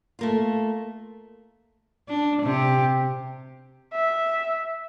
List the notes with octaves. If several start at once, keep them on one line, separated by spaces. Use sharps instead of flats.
A3 A#3 F4
D4
C3 G4
E5